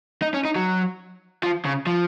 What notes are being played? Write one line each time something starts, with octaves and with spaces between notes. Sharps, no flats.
D#4
C#4
D#4
F#3
F3
C#3
F3